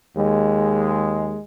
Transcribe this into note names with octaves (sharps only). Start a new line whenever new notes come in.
D#2 G#3